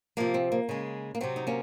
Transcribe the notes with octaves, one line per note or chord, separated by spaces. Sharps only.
C3 F3 G#3 A#3
C4
A#3
C#3 G#3
A#3
C3 F#3 C4
D#4
A#3 C#4